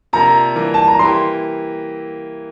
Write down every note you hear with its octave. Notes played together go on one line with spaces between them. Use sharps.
C3 F3 A#3 D4 A#5
E3 G3 A#3 D4
A5
A#5
E3 A#3 E4 G4 C6